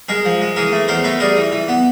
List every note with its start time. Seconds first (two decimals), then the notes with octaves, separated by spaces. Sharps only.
0.09 G#3 G#4 A#4
0.25 F3
0.41 G#3
0.56 E3 G#4 A#4
0.72 A3
0.88 E2 A#4 C5
1.04 A3 A4 B4
1.20 G3 G#4 A#4
1.37 E3
1.52 E3
1.68 B3